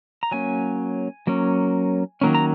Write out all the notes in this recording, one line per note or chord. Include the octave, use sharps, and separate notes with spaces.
A#5
F#3 A#3 C#4 G#5
F#3 A#3 C#4
D#3 F#3 A#3 C#4
A#5